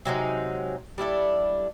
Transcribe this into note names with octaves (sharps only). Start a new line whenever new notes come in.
C3 F#3 G#3 D#4
G3 D4 E4 A4